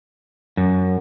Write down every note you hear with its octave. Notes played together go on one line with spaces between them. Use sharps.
F#2